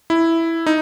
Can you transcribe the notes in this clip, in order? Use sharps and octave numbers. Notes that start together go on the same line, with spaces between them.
E4
D#4